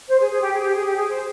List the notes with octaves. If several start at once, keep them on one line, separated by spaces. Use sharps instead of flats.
C5
G#4
G#4
G4
G#4
G4
G#4
G4
G#4
C5